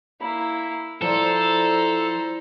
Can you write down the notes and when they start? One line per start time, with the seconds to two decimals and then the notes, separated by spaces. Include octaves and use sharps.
0.20 A#3 E4 B5
1.01 F3 E4 A4 C5 D5 A#5